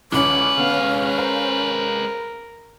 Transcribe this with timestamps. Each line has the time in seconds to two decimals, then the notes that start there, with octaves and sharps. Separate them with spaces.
0.12 C#2 D3 E3 G#3 C#4 B4 D6
0.57 D3 B3 F5
1.18 A#4 C5 F5 A#5